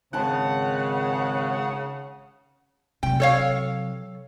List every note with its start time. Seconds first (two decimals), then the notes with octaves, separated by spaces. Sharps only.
0.13 G#1 C#3 F#5 G5 A5 C6
3.03 C3 F#3 G5
3.20 A4 C#5 F5